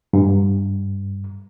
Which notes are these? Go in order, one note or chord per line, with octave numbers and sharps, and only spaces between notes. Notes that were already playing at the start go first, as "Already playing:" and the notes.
G2